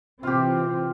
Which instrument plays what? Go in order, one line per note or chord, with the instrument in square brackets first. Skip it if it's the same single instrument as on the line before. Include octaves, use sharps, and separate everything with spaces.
[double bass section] C3 E3 C4 [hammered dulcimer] F4 G4